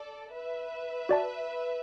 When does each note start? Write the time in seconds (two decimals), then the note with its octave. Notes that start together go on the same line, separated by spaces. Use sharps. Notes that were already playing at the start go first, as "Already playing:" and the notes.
Already playing: A4 D5
0.33 B4 E5
1.09 F#4 D5 A5